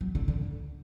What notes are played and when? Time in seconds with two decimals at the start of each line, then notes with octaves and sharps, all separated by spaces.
0.01 F#3
0.15 D3
0.28 D3